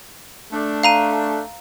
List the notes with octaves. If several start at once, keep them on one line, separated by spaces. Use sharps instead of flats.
A3 D4
F5 A#5 D#7